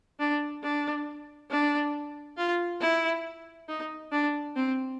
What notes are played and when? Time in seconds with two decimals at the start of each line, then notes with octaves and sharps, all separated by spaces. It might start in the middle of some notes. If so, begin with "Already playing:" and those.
0.20 D4
0.63 D4
1.50 D4
2.37 F4
2.81 E4
3.68 D#4
4.12 D4
4.56 C4